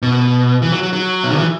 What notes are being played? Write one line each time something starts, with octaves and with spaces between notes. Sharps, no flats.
B2
E3
F#3
F#3
F#3
B2
D3
E3